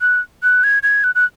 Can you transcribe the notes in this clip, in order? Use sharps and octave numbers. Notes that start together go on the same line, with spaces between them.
F#6
F#6
G#6
G#6
F#6
F#6